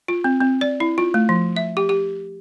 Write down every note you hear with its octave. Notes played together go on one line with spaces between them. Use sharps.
F4
C4
C4
D5
E4
F4
A3
F3
E5
G4
G4